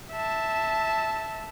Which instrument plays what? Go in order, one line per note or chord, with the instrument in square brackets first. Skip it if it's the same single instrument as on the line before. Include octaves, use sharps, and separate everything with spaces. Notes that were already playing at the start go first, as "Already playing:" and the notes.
[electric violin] E5 A5